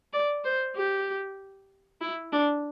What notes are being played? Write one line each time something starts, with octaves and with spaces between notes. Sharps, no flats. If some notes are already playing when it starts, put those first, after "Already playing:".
D5
C5
G4
E4
D4